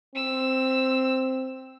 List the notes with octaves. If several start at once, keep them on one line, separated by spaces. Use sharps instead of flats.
C4 E6